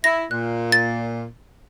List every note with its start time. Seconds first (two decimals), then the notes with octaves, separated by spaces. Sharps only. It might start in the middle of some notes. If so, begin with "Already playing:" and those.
0.04 E4 A#6
0.31 A#2 F#6
0.72 A6